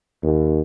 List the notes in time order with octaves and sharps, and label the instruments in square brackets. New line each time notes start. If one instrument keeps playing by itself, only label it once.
[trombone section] D#2